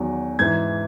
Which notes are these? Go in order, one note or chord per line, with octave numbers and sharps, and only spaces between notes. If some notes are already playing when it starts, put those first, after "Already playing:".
Already playing: E2 D#3 F#3
G#2 E3 G#6